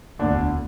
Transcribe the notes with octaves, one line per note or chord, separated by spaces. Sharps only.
E1 D2 D3 D4